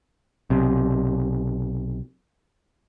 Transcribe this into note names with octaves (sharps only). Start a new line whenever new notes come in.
B1 C3